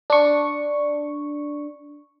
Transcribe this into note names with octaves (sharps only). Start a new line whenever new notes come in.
D4 C#6